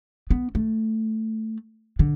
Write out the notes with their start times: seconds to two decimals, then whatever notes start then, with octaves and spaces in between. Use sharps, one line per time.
0.30 B3
0.55 A3
1.99 D3